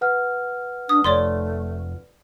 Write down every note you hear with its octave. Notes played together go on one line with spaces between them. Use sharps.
B4 F#5 F6
D4 D#6
F1 A3 C#5 D5 C6